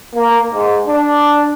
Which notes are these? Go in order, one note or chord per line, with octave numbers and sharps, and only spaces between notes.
A#3
G#2
D4